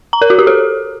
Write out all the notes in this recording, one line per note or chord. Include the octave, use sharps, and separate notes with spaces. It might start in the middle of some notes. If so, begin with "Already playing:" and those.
A#5
A#4
F#4
G4
A4